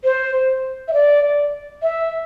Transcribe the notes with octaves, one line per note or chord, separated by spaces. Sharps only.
C5
E5
D5
E5